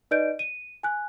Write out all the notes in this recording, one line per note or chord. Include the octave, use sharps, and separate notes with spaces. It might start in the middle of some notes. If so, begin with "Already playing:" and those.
D#4 B4 D5 D#5 G6 D7
D#7
G#5 F#6